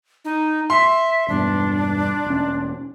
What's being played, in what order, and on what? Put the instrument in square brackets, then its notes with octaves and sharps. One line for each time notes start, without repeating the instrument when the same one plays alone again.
[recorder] D#4
[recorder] E5 [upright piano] C6
[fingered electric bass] E1 G2 B3 [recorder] D4
[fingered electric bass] E1 C#4